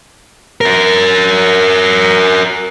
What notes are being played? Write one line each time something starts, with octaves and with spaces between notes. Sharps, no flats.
F#4 A#4